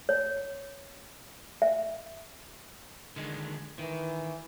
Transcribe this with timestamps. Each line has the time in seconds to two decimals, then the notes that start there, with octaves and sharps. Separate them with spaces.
0.09 C#5
1.62 E5
3.16 D3 D#3 G#3
3.79 D#3 E3